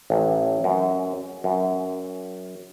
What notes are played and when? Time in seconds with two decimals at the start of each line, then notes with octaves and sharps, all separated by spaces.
0.10 A1
0.64 F#2
1.44 F#2